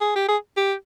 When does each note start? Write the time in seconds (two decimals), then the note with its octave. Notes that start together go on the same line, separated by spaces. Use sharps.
0.01 G#4
0.16 G4
0.28 G#4
0.57 G4